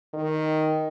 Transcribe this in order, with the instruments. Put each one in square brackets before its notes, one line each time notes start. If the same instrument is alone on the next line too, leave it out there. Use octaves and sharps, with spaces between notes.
[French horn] D#3